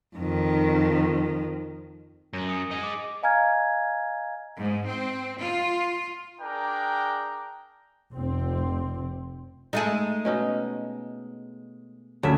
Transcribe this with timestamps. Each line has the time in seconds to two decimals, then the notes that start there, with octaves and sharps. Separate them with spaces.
0.16 F2 D#3
2.33 F#2 A#6
2.48 G#5 D#6 C#7
2.71 D#4 G#4
2.83 D6
3.23 D#5 F5 G#5 A#5 F6 G#6
4.57 G#2
4.87 C4
5.39 F4
6.40 D4 G#4 A#4 G5 A#5
8.13 F1 C4
9.73 G#3 A3 D#4 G#4 A4
10.25 B2 C#4 D#4
12.23 D2 C#3 E5